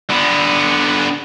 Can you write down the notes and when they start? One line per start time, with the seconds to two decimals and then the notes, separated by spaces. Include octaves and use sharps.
0.10 D3 B3